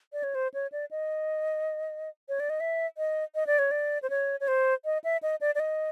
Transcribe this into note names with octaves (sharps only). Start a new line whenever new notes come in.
D5
C#5
C5
C#5
D5
D#5
C#5
D5
D#5
E5
D#5
D#5
D5
C#5
D5
C5
C#5
C#5
C5
D#5
E5
D#5
D5
D5
D#5